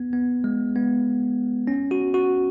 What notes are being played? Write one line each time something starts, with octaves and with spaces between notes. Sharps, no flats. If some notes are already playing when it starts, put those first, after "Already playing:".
Already playing: B3
B3
G#3
B3
C#4
F#4
F#4